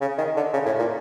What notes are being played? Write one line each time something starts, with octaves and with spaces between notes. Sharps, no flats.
C#3
D#3
D3
C#3
A2
A#2